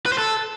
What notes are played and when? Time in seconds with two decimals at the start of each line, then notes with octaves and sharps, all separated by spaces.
0.06 B4
0.12 C5
0.18 A4